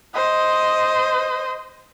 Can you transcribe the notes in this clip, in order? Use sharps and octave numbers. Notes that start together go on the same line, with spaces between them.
C5 D#5